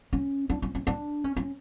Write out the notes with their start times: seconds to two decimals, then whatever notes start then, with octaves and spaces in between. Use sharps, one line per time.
0.13 C#4
0.50 D4
0.62 C#4
0.75 C#4
0.87 D4
1.24 C#4
1.37 C#4